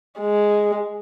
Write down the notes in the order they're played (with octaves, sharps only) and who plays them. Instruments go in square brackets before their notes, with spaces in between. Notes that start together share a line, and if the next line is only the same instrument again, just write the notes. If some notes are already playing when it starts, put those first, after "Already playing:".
[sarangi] G#3